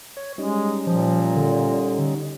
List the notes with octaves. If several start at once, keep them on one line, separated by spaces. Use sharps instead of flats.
C#5
G3 G#3 C#4 D#4
A#2 F3
D3